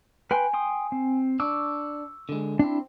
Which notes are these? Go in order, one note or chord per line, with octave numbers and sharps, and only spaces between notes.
B4 G5 G#5 C6
G5 C6 D#6
C4
D4 C#6 D6 E6
D3 G#3
C4 D4 E4